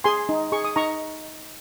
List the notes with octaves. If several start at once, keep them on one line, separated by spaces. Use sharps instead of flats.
G#4 G#5 C6
D#4
G#4 C#6
D#6
D#4 A#5 C#6